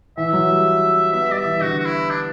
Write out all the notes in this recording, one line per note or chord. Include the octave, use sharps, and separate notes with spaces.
E3 E5
F#3
G3
B3 E5
G3 D5
E5
E3
D3 F#4
F#4
E4
D4